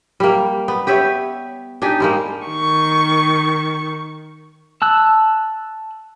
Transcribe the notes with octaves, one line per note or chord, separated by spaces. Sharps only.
G3 A#3
B3
G4 B4 C#5 E5
D4 D#4 G4 G#4
G3 G#3 A#3
D#3 C#6
A5 E6 F#6